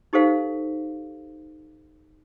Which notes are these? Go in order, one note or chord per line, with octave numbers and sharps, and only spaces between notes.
D#4 G4 A4 C5 F5